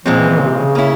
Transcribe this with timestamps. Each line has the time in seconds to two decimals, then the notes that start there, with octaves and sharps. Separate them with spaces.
0.05 A#2 F3 G#3 C4
0.18 E3
0.29 E3
0.40 C#3
0.49 C3
0.56 C#3
0.75 A#3 C#4 E4